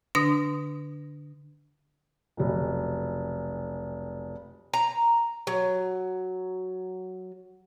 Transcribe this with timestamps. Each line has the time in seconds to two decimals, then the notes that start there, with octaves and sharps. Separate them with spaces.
0.15 D3 D4 D#6 A#6
2.37 F1 B1
4.73 A#5
5.47 F#3